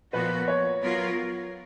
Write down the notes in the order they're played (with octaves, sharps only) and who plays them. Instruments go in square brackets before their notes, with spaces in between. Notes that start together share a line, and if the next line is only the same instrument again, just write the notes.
[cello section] A#2 F3 B3 F#4 [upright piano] B4
[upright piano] C#5
[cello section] F#3 B3 F4 A#4